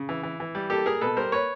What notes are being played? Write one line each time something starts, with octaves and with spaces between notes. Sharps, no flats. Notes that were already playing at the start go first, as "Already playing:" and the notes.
Already playing: C#3
E3
E3
E3
G3
A#3 G4 A4
A#3 G#4 A#4
B2 A4 B4
G3 A#4 C5
A#3 B4 C#5